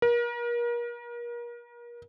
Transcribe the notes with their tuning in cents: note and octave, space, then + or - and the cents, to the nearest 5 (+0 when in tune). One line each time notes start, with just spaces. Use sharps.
A#4 +35